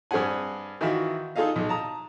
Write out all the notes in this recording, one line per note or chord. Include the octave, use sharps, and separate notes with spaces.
G2 C4 G#4 C5 F#5 G#5
D#3 E3 F4 F#4 E5 F6
D#4 F4 G#4 A4 D#5 F5
B1
A5 A#5 D#6